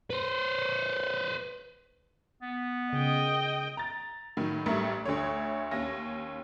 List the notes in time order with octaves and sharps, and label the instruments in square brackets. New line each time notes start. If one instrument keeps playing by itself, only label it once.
[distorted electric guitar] B4 C5
[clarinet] B3
[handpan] C#3 [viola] D#5 G5
[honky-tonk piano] A#5 A6
A2 D#3 F#3
A1 G2 G3 A3 A#4 E5
D2 D3 A3 C#5
D#2 C#4 A#6